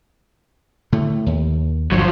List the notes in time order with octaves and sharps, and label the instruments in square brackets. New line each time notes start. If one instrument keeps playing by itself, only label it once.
[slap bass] A2 D3 A3
D#2
[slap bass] G1 [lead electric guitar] F3 F#3